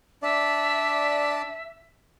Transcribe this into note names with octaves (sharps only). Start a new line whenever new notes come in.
D4 D5 E5